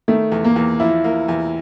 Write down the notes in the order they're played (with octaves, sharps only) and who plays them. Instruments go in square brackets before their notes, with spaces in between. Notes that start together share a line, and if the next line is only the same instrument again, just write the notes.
[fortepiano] D#3 [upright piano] A3
[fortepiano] E2
[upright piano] A#3
[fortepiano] E2
[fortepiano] F3 [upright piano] E4
[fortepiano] A#3
E2